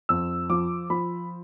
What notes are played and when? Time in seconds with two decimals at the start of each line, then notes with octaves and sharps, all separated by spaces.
0.09 F2 E6
0.50 F3 D6
0.90 F3 B5